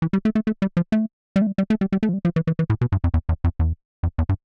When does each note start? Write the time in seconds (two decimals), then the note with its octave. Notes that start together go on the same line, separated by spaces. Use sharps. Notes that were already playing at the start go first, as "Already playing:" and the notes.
0.02 E3
0.13 G3
0.25 A3
0.35 A3
0.47 A3
0.62 G3
0.77 F3
0.92 A3
1.36 G3
1.42 A3
1.47 G3
1.58 G3
1.70 A3
1.81 G3
1.92 G3
2.03 A3
2.09 F3
2.14 G3
2.25 F3
2.36 E3
2.47 E3
2.59 E3
2.70 A2
2.81 B2
2.92 G2
3.04 F2
3.14 E2
3.29 E2
3.44 F2
3.59 E2
4.03 F2
4.18 E2
4.29 G2